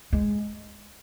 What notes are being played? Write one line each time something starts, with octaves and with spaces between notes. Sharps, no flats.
G#3